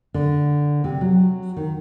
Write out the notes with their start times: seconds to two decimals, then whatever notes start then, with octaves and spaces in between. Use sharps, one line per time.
0.14 D3
0.84 C3
1.01 F#3
1.57 D#3